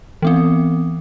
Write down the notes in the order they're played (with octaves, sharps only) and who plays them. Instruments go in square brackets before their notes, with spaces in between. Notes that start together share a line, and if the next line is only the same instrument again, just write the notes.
[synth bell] E3 B3 C4